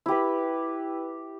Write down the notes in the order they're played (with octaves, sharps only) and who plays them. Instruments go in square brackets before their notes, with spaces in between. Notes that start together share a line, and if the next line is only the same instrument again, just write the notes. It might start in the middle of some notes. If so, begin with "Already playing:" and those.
[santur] E4 G4 B4